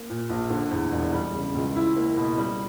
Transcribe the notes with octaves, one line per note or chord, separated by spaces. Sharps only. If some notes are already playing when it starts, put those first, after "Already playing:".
Already playing: A#3
A#2
A#1
D3
E2
E1
G3
C#3
C#2
E4
A#3
B2
G3